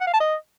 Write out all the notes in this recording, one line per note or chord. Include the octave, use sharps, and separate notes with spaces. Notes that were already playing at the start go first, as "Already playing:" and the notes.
F#5
F5
A5
D#5